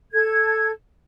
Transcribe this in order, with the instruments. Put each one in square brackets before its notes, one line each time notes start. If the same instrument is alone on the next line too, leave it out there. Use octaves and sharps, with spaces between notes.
[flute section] A4 G#6